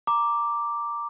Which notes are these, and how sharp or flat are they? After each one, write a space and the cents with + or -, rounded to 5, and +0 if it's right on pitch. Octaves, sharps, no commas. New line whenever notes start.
A#5 +0 D6 +0